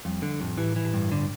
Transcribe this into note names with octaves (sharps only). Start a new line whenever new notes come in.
F2 G3
D3 F3
F2 A2
A2 E3
A2
E3
A2
G2
D3